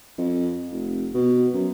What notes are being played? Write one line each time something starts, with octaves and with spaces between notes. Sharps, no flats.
F2
F1
B2
F#2